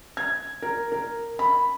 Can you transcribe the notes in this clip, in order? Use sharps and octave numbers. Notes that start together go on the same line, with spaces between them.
G#6
A#4
A#4
B5